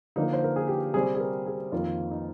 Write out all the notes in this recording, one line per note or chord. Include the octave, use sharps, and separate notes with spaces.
D3 F3 A#3 D#4
C5
A#4
G#4
G4
C3 G3 C4 G#4
G#4
A#4
G#4
F2 D#3 A#3 F4
D#4